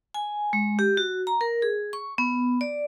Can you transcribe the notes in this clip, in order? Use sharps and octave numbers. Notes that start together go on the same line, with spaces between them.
G#5
G#3
G4
F#4
A#5
A#4
G#4
C#6
B3
D5